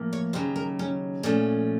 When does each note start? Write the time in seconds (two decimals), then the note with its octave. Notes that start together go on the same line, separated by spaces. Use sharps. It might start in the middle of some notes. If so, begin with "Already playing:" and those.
Already playing: A2 F3 A#3
0.13 C#5
0.33 D#2 C#3 F#3 C5
0.56 A#4
0.79 C#4
1.23 A#2 F3 A3 C#4